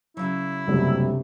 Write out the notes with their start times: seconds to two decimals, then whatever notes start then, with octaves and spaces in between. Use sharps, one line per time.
0.17 C#3 F#3 E4
0.67 F#1 D2 G2 C3